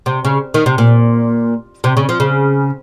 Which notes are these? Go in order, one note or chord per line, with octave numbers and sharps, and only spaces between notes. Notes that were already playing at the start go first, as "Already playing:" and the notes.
C3
C#3
D#3
C3
A#2
C3
C#3
F3
C#3